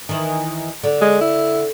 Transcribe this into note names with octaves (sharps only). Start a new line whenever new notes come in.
D#3 E3
D3
G#3
E4